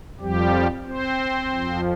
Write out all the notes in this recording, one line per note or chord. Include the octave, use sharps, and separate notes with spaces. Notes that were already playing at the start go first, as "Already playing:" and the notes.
F2 F3 G3 G4
C4 C5
F2 F3